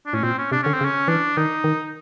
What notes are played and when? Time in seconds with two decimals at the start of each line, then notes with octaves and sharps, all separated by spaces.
0.06 D4
0.13 A2 C#4
0.23 A#2 C4
0.38 C#4
0.52 C3 D4
0.63 D3 C#4
0.74 C4
0.81 C#3
0.85 C#4
1.08 E3 D4
1.37 D#3 D#4
1.64 D#3